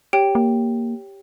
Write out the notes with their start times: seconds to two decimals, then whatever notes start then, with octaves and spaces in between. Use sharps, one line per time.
0.13 G4 C#5 G5
0.35 A#3